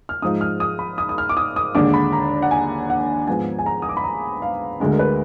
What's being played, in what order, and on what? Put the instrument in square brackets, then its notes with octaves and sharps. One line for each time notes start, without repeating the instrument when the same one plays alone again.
[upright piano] F6
G#2 F3 G#3 D#4 D#6
F6
D#6
B5
D#6
D#6
F6
D6
D#6
D#6
D#2 D3 G#3 D4 D6
B5
A#5
F#5
G#5
F#5
G#2 F3 B3 G#5
G#5
A#5
D#6
D6
B5
A#5
F5
D2 D3 G#3 D4
A#4
B4